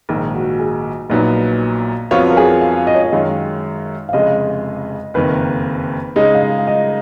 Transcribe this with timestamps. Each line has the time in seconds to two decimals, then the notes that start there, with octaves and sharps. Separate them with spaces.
0.09 A#1 G#2 D#3 A#3
0.34 F#4
0.59 G#4
1.09 A#1 A#2 F#3 B3 D#4
2.11 F2 F3 B3 F4 F#4 C#5
2.30 A#4
2.37 G#4
2.61 F5
2.87 D#5
2.95 C#5
3.02 D#5
3.12 F#2 D#3 G#3 F5
4.09 F5
4.13 F1 F2 C#3 G#3 D#5
5.14 F#1 F2 D#3 A#3 B4
6.16 C#3 G#3 D#4 D#5
6.35 F5
6.41 D#5
6.59 F5
6.67 D#5